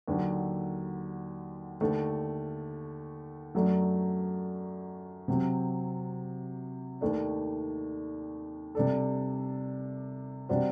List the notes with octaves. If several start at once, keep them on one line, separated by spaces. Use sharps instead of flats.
D#2 D3 F#3
D#2 D3 A3
F#2 F#3 A3 D4
C3 F#3 C4
D#2 D#3 A3 D4
C3 G3 D4 A4
C3 G3 D4 F#4 C5